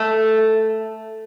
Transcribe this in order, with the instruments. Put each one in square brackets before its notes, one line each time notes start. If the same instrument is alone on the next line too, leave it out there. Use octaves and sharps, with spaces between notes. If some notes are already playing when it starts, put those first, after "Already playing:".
Already playing: [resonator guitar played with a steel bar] A3